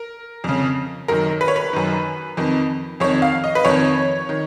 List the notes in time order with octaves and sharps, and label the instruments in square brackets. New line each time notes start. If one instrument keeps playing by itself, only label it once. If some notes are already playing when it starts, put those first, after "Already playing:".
Already playing: [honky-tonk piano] A#4
F2 C#3
F#2 D#3 A#4
B4
C#5
B4
F#2 D#3
F2 D#3
F2 D#3 C#5
F5
D#5
B4
F2 D#3 C#5
D#3